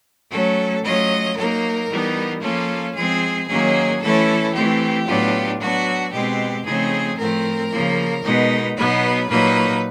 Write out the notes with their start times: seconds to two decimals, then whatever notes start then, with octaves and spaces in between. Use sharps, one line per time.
0.30 F#3 A3 C#4 A4
0.83 F#3 A3 C#4 F4 D#5
1.36 F#3 A#3 D#4 A#4
1.89 E3 G3 B3 D#4
2.41 F3 A#3 C#4 F4 A4
2.94 F3 G#3 C4 G#4
3.47 D#3 F#3 A#3 C#4 G#4
4.00 E3 A3 C#4 E4 A4
4.54 E3 A3 C4 G4
5.06 A2 F#3 B3 D4 F4
5.59 F#3 B3 D4 F#4
6.12 B2 G#3 C4 G4
6.64 C#3 F3 A3 C4 D#4 G#4
7.17 A2 F3 A3 C4 A#4
7.70 C#3 F3 A#3
8.23 B2 G#3 B3 D#4
8.76 B2 F#3 B3 D#4 B4
9.29 A#2 F#3 A#3 D#4 B4